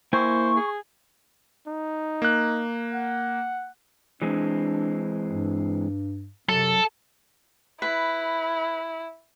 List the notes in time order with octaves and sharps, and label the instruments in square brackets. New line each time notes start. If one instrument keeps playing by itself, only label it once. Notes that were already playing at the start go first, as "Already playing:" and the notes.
[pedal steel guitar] A#3 E4 G#5 [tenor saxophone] C5 [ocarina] C#6
[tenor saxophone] G#4
[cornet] D#4
[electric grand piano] A#3 F#6
[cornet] F#5
[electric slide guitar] E3 G#3 C4 [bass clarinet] D4
[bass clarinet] G2
[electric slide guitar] F#2 [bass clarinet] C3 [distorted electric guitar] A4
[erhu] E4 [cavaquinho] B4